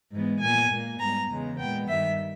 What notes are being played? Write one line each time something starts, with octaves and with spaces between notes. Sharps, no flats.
G#2 E3 G#3 B3
A#2 G#3 B3 G#5
A#2 A#3
G#2 G3 B3 A#5
E2 C#3 E3 G#3 B3
A#2 G#3 B3 G5
G2 D#3 G3 E5